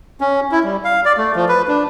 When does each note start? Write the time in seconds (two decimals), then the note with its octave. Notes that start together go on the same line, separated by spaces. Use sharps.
0.21 C#4
0.52 E4
0.64 G3
0.85 F5
1.05 D5
1.17 A3
1.36 F3
1.48 B4
1.68 D4